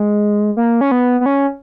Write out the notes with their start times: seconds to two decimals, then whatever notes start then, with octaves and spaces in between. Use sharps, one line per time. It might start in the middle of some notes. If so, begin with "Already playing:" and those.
Already playing: G#3
0.57 A#3
0.81 C#4
0.92 B3
1.21 B3
1.26 C#4